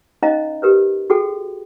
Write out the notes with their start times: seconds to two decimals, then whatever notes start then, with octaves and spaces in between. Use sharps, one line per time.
0.22 C#4 D#4 C5 D#5 F5 A#5
0.62 G4 A#4 B4 C#5
1.10 F#4 G#4 A4 G5